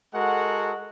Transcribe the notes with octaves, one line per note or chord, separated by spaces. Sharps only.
G#3 F#4 A4 A#4 F#5